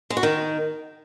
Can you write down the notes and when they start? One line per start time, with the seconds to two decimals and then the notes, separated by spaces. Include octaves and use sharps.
0.10 G#3
0.17 F#4
0.23 D#3